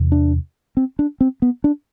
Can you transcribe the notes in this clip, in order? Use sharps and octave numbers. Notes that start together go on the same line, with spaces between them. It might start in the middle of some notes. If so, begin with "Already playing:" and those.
Already playing: E2 C3
D4
C4
D4
C4
B3
D4